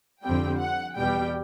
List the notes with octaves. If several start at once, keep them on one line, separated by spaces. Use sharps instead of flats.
F2 D3 G3 C4 G5
F#5
E2 B2 G3 G5